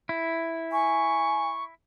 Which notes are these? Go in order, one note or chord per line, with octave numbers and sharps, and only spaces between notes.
E4
G#5 C#6